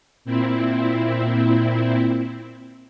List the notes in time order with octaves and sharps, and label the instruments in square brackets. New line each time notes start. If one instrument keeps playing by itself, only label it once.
[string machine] A#2 C4 E4